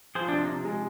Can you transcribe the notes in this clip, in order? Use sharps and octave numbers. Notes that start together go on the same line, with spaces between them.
F3 G#4 C5
C3 D4
D#4
C3
G#3